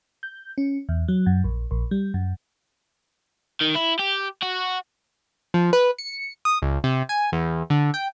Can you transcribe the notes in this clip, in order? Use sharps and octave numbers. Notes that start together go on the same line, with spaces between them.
G6
C#4
E2
F#3
F#2
A#1
A#1
G3
F#2
D#3
E4
G4
F#4
F3
B4
C#7
D#6
C#2
C3
G#5
E2
D3
G5